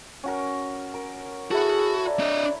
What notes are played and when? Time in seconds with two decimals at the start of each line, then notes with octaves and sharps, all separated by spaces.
0.23 C#4 F#4 A#4
0.94 A#4
1.51 E4 F#4 G#4 A4
2.07 D5 A#5
2.20 D4 D#5